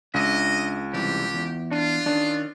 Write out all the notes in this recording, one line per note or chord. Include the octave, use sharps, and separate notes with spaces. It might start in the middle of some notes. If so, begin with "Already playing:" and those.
C#2 D4 D#5 E5
C3 E3 G3 G4
E2
D4 F4
D#3 C#4 D4